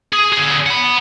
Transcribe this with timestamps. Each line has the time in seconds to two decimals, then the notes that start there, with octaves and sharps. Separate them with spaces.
0.13 G#4
0.33 D3 G#4
0.67 F#5 B5